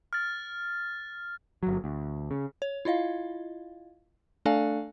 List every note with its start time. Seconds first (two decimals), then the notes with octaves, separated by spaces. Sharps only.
0.13 F6 A6
1.63 G1 F#3
1.84 D2
2.31 C#3
2.62 C#5
2.85 E4 F4 D#5 F5
4.45 A3 D4 A4 D5 F5 G#5